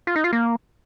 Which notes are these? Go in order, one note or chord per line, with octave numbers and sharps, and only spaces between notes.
F4
D#4
F4
A#3